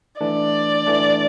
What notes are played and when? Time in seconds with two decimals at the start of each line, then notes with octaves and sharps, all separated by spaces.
0.21 E3 A3 D4 D5
0.86 E3 A3 D4